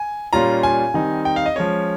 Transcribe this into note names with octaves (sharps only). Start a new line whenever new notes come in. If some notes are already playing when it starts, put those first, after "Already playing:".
Already playing: G#5
A#2 G3 C#4 F4 A#5
G#5
D#3 G3 C4 D#4
G5
F5
D#5
F3 G#3 C#4 C#5